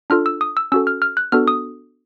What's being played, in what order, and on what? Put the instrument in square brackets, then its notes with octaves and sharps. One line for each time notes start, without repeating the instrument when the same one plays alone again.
[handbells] D4 F4 A4 F6
E6
D#6
E6
C#4 F#4 A4 E6
F6
F6
F#6
B3 D4 F#4 A4 F6
D#6